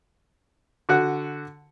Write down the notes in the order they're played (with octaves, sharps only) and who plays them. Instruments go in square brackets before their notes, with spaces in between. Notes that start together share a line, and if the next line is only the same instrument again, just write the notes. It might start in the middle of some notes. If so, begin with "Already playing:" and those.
[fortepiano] D3 F#4 F#5